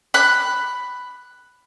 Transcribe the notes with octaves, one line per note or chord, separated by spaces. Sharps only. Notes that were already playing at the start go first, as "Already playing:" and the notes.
B5 F#6